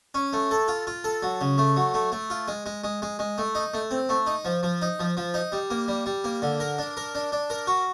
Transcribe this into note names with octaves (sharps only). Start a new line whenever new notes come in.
C#4
A3
A4
F4
F4
A4
F#3
C#3
A3
F#3
A3
A3
F4
G#3
G#3
G#3
G#3
G#3
A3
D#4
A3
C4
A3
D#4
F3
F3
D#4
F3
F3
D#4
G3
A#3
G3
G3
A#3
D3
A#4
D4
A#4
D4
D4
A#4
F#4